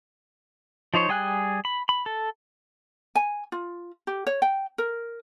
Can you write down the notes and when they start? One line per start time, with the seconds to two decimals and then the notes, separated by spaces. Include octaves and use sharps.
0.94 F3 D#4 C5 C#5
1.09 G3 G#4 G5 G#5 F#6
1.65 B5
1.89 B5
2.06 A4
3.15 G#5
3.52 F4
4.07 G4
4.27 C#5
4.42 G5
4.78 A#4